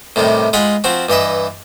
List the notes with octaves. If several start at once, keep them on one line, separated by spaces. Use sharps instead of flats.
A2 C3 D#3 G3
G#3 F4 F#5 B5
F3 C4 F#4
G2 E3 D#5 E5